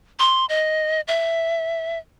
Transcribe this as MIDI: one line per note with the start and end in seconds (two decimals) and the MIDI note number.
0.19 0.45 84
0.49 1.01 75
1.08 1.98 76